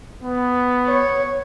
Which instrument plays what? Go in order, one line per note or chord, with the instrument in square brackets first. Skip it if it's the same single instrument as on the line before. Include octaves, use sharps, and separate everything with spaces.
[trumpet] B3
[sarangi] C#5